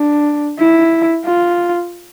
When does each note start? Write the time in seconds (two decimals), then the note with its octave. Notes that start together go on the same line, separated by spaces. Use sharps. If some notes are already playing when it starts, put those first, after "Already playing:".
Already playing: D4
0.59 E4
1.26 F4